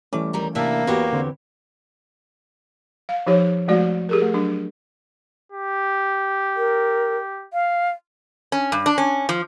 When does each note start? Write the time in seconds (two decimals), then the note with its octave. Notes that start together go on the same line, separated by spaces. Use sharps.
0.13 E3 G3 A3 C#4 D6
0.33 D#2 G3 A#5
0.55 C3 A#3 D4 E4 A4 E5
0.87 E2 E3 B3 F#4 G4 C#5
1.13 D3 C4
3.09 F5
3.27 F3 D#4 G4 C#5
3.68 F3 G#3 A3 F#4 D5
4.09 G4 G#4 A#4
4.22 A3
4.34 F#3 D4
5.52 G4
6.57 A#4
7.53 F5
8.52 C#4
8.72 G2
8.86 D4
8.98 C#4
9.29 F3